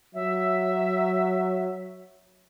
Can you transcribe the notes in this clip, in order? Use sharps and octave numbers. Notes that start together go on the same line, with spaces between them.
F#3 E5